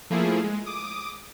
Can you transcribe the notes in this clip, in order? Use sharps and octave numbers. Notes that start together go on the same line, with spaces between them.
F3 A3 A#3 E4 F4 G#4
G#3
D6 D#6